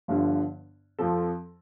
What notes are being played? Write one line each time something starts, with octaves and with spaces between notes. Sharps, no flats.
G1 G2 D3 F3
F2 F3 C4 A4